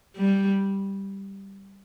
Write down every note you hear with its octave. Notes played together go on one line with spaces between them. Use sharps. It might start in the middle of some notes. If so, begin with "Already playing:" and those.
G3